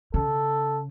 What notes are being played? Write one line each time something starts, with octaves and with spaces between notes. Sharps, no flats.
C#3 A4